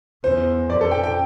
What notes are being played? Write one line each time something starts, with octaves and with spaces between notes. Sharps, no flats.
E2 C5
F2 D5
A4
G5
G5